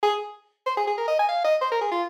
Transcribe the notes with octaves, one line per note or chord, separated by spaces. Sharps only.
G#4
C5
G#4
G#4
A#4
D#5
G#5
F5
D#5
C5
A#4
G#4
F4